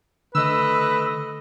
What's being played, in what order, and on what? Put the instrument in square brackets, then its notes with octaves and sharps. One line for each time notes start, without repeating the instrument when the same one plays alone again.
[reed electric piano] D3 [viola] A3 D#5 [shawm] B4 [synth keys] E6